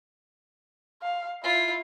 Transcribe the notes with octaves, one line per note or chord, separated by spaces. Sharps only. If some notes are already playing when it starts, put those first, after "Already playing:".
F5
E4 F4